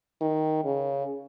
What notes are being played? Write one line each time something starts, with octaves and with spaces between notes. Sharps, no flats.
D#3
C#3